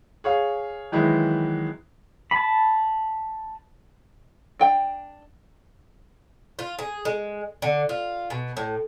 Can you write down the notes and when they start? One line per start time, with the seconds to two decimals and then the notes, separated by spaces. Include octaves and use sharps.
0.24 G#4 C#5 F5
0.92 D#3 E3 F#3 G#3 B3 E4
2.31 A5 B5
4.59 D4 G5
6.59 F4
6.79 G#4
7.05 G#3
7.62 D3
7.89 F4
8.30 B2
8.57 A2